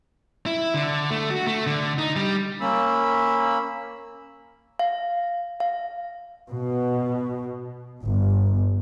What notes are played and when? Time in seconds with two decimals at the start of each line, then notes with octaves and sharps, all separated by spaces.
0.46 E4
0.75 D3
1.10 A3
1.30 F#4
1.47 A3
1.67 D3
1.98 D#4
2.16 G3
2.61 A#3 C#4 B5 E6
4.79 F5
5.60 F5
6.50 B2
8.04 G1